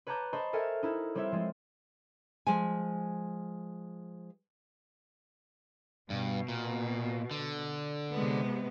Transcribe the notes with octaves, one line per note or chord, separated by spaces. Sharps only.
B4 C#5 A5 A#5 D6 G6
C5 D#5 A5 B5 C#6
A4 A#4 E5 G#5
D#4 E4
G3 C4 A#4 C5 C#5 E5
F3 G#3
F3 G#3 G#5
G2 B2
A#2
D3
C3 G#3 B3